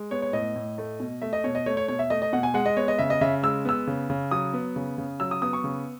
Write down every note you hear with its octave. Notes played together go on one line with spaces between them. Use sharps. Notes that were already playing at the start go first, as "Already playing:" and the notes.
Already playing: G#3
B3 C#5
C#5
A2 D#5
A2
A3
B2
A3 E5
D#5
B2 C#5
D#5
A3 C#5
C#5
B2 C#5
E5
A3 D#5
D#5
B2 F#5
G#5
G#3 F#5
D#5
B3 C#5
D#5
C#3 E5
D#5
C#3 E5
G#3 E6
B3 E6
C#3
C#3
F#3 D#6
B3
C#3
C#3
F#3 E6
D#6
B3 D#6
C#6
C#3